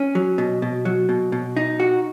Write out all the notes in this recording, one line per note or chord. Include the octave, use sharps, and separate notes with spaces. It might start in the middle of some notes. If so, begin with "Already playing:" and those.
Already playing: C#4
F#3
B2
B2
F#3
B2
B2
D#4
F#4